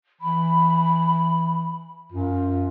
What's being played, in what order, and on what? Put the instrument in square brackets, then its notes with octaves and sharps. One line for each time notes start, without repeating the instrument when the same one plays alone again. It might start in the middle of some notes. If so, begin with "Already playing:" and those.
[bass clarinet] E3 [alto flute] B5
[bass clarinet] F#2 [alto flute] F4